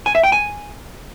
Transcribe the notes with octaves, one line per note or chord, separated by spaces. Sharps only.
G#5
E5
G5
G#5